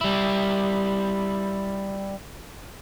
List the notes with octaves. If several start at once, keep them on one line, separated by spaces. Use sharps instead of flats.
G3 E4